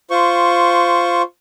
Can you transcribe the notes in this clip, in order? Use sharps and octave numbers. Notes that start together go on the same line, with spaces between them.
F4 C5 C#6